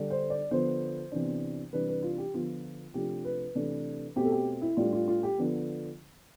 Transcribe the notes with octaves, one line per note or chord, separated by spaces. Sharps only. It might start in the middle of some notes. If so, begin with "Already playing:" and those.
Already playing: D3 G3 D4
C5
D5
D3 F3 B3 C5
C3 E3 B3 D4
C3 E3 G3 D4 B4
B4
F4
G4
D3 F3 B3 F4
C3 F3 A3 D4 G4
B4
C3 E3 A3 D4
B2 A3 C4 G4
A4
G4
E4
A2 G3 D4 F4
F4
F4
G4
D3 F3 B3